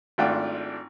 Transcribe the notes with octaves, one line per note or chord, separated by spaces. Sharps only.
G#1 A3 D4 F4 F#5 G5